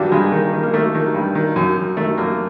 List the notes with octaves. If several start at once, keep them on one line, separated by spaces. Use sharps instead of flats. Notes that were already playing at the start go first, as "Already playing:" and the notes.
Already playing: G2 D#3 F#3 G3
G2 G#3
D#3
D#3
A#3
D#3 A3
D#3
G2
D#3
F#2
F#2
D#3 A3
F#2 A#3